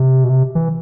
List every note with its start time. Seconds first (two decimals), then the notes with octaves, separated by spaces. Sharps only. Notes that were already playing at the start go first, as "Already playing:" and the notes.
Already playing: C3
0.24 B2
0.30 C3
0.55 E3